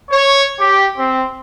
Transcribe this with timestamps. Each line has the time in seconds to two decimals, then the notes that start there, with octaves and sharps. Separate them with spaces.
0.10 C#5
0.58 G4
0.98 C4